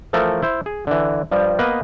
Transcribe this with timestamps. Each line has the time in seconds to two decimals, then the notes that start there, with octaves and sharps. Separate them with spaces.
0.13 E3 F3 A3 A4 A#4
0.42 E4 C5
0.66 G#4
0.87 D3 E3
1.31 G2 F3 G3
1.59 A#3 B3 B4 D#5